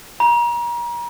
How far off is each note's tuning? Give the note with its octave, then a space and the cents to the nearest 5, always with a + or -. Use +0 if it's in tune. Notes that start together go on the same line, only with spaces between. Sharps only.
A#5 +35